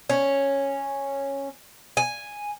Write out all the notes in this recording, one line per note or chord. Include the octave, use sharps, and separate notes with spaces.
C#4
G#5